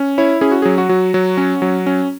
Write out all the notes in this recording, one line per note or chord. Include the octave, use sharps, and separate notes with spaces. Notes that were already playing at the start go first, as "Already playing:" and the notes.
Already playing: C#4
E4 C#5
C#4 G#4
F#4
F#3 G#4
F#4
F#3
F#3
C#4
F#3
C#4